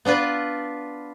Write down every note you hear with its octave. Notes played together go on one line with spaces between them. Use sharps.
B3 D4 F4 B4